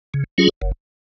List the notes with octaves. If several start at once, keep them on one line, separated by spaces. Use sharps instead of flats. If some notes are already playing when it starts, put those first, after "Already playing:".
C#3
F#3 C#4 F4 G#4
F#1